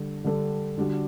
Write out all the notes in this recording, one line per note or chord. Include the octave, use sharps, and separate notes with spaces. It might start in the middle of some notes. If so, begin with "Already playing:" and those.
Already playing: D3 G3 D4 A4
D3 G3 D4 A4
D3 G3 D4 F#4